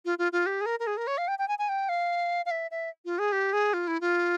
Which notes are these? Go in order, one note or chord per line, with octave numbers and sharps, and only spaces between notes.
F4
F4
F4
G4
G#4
A#4
A#4
G#4
A#4
C#5
F5
G5
G5
G#5
G#5
G5
F5
F5
E5
E5
F4
G#4
G4
G#4
F4
E4
F4